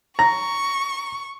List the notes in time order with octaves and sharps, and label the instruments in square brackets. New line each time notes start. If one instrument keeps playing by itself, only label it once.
[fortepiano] A#5 [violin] C#6